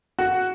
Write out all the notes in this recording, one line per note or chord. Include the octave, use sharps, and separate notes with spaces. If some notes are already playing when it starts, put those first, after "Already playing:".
F#4